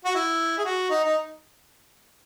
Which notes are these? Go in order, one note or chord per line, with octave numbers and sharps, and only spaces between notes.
F#4
E4
G#4
F#4
D#4
D#4